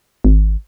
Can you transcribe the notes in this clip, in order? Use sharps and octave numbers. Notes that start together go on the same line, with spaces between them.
G#1